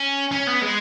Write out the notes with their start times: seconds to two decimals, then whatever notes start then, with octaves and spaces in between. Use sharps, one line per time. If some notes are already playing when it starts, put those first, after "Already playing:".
Already playing: C#4
0.31 C#4
0.47 B3
0.62 G#3